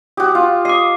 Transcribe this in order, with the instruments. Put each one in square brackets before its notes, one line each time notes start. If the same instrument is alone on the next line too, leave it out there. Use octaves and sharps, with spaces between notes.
[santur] F#4 G4 [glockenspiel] D#6
[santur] F4
[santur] D#5 [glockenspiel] D6 C7